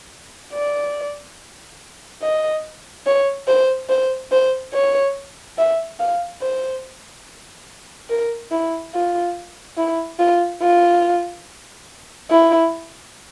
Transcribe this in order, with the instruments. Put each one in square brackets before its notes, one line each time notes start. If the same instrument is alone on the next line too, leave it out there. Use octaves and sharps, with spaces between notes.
[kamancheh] D5
D#5
C#5
C5
C5
C5
C#5
E5
F5
C5
A#4
E4
F4
E4
F4
F4
E4